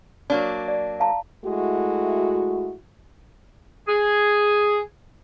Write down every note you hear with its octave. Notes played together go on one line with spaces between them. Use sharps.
F#3 A#3 D4
D5
F5 A5 A#5
G#3 A3 E4 F#4
G#4